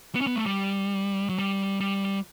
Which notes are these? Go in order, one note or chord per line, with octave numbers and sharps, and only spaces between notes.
B3
C#4
B3
A3
G3
F#3
G3
G3